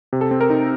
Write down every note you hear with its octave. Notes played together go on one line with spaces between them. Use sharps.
C3
A4
C4
A#4
D#4